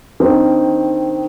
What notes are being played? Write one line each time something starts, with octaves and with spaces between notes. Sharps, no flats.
D#3 C4 D4